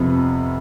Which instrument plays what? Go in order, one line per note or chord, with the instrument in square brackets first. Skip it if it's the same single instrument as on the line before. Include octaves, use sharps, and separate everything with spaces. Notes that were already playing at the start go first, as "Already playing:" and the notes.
Already playing: [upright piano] F2 C3 F3 B3